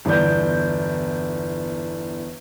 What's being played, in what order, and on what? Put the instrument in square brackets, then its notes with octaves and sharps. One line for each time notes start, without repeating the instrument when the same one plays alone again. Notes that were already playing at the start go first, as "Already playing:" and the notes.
[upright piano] G1 E2 D5 G6